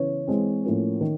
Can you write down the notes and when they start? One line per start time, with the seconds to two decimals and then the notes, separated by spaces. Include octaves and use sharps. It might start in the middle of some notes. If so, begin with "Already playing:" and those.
Already playing: C#3 E3 B3 C#5
0.27 E3 G#3 C4
0.64 A2 F3 A#3 C#4
1.01 D#3